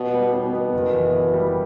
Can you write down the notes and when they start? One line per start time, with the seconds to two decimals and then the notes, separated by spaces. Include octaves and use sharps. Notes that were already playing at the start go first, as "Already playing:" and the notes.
Already playing: B2 B3
0.13 G3
0.33 B2 B3
0.53 B3
0.73 F#1
0.93 E3
1.13 E3
1.34 G3